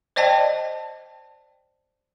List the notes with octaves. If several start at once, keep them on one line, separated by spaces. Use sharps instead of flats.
C5 D5 D#5 G5 A5